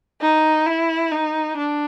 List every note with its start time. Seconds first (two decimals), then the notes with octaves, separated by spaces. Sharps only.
0.22 D#4
0.66 E4
1.12 D#4
1.57 D4